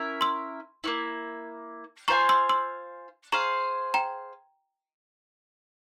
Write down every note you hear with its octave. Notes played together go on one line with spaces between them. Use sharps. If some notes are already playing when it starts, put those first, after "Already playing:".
Already playing: C#4 E4 A#4 E5
C6 E6
A#3 C#4 E4
F4 C5 F5 G#5 A#5 C#6
C6 E6
C6 E6
G#4 C5 F5 A#5 C#6
G5 A#5